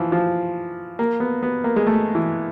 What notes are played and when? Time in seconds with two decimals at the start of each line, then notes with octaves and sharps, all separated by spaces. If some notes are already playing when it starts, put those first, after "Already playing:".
Already playing: E3 F3
0.12 F3
0.99 A#3
1.20 B3
1.43 B3
1.64 A#3
1.76 G#3
1.86 A3
2.15 E3